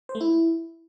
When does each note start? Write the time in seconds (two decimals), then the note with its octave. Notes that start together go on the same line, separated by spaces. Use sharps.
0.09 C5
0.15 A3
0.21 E4